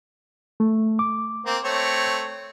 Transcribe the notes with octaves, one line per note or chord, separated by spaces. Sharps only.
A3
D6
A#3 C4
A3 C4 C#5